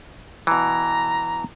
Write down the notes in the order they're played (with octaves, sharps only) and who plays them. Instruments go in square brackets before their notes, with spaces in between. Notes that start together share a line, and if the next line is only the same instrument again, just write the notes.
[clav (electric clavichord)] B2 E3 [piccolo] A#5